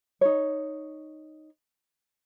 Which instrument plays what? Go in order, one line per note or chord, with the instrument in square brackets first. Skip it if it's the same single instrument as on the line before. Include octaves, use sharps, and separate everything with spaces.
[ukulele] D#4 C#5